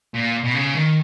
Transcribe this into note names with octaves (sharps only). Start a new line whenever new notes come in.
A#2
B2
C#3
D#3